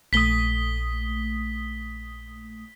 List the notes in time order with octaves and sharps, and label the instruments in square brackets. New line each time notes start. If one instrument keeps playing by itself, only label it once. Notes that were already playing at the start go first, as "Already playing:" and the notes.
[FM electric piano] A#1 A3 D#6 [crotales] B6 G7